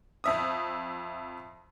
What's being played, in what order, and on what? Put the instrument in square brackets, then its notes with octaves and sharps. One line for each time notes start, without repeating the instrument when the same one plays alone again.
[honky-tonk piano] F2 E5 D#6